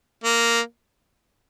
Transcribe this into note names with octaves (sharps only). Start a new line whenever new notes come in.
A#3